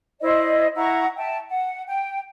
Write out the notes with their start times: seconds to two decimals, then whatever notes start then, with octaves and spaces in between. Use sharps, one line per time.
0.21 E4 C5 D5 D#5
0.76 E4 F#5 A#5 C#6
1.16 E5 G5 A5
1.49 F#5
1.87 G5